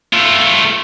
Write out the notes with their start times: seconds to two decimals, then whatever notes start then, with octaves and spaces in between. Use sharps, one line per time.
0.13 A3 F4